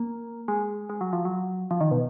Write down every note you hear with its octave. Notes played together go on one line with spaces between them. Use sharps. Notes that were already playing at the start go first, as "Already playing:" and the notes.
Already playing: A#3
G#3
G#3
F#3
F3
F#3
F3
D#3
B2